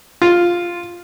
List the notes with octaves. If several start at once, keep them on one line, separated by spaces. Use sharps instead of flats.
F4